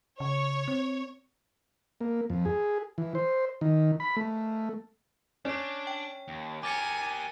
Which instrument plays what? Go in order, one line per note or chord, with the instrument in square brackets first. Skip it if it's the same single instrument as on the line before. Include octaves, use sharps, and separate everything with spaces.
[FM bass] C#3 [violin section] C#5
[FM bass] C4
[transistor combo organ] A#3
F2
G#4
E3
C5
D#3
B5
A3
[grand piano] C#4 [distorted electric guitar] D4 [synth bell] D5 D6
[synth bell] G5
[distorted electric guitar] D#2
[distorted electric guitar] G4 A#4 [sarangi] G#5 [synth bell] D6 A6 C#7